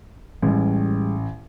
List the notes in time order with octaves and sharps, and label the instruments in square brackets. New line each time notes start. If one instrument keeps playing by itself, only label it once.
[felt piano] A1 [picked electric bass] G3 G#3